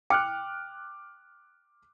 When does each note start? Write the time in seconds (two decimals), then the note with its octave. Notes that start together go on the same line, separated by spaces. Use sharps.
0.10 G5 D6 F6 F#6